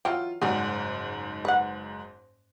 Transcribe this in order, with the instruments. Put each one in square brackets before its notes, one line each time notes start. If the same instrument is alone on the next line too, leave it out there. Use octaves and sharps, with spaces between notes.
[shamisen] E3 F#3 G5 [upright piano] F4
[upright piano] F#1 G#2 [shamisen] G3 F#4 G#4
[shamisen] B4 F#5